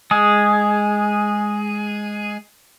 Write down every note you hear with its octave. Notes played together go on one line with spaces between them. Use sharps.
G#3 G#4